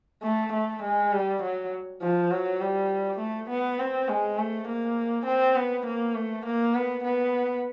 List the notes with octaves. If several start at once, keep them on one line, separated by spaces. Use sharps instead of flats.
A3
A3
G#3
G3
F#3
F3
F#3
G3
A3
B3
C4
G#3
A3
A#3
C4
B3
A#3
A3
A#3
B3
B3